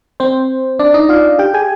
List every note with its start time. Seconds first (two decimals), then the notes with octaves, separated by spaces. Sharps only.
0.20 C4 C5
0.79 D4 D5
0.94 D#4 D#5
1.09 F4 F5
1.39 G4 G5
1.54 G#4 G#5